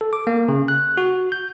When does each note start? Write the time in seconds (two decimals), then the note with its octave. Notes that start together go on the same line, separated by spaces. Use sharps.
0.01 A4
0.13 D6
0.27 A#3
0.49 C#3
0.68 F#6
0.97 F#4
1.32 G6